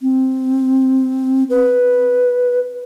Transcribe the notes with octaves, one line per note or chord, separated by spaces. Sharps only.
C4
B4